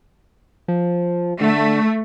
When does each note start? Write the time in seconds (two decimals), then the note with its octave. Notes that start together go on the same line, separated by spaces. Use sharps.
0.68 F3
1.41 D3 A3